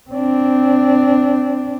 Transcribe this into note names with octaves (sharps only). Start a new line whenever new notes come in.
C4 D4